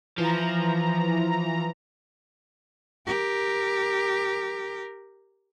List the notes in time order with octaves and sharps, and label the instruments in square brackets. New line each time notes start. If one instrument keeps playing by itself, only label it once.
[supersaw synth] E3 A#5 [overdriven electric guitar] F3
[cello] G4 A#4